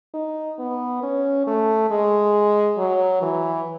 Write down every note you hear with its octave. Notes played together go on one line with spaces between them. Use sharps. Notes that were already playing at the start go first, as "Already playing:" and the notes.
D#4
B3
C#4
A3
G#3
F#3
E3